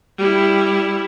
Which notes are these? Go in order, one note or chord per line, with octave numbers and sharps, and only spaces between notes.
G3 E4